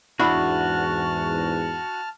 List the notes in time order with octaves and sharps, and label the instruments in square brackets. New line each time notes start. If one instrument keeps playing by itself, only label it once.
[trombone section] E2 G#2 [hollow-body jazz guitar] D4 E4 B5 [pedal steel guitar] F#4 [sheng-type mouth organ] A5 F6